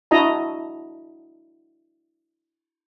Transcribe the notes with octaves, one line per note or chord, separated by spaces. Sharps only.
D4 E4 F#4 D#5 A5 A#5